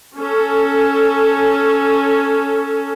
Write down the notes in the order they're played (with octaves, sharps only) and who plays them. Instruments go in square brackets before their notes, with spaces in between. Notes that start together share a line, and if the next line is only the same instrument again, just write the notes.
[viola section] C#4 A4